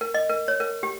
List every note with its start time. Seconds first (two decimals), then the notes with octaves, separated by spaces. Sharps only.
0.01 A#4
0.14 D#5
0.30 A#4
0.48 C#5
0.60 A#4
0.83 G4